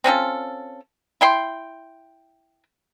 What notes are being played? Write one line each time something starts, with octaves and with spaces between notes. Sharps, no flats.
C4 C#4 F4 A4
E4 G5 C6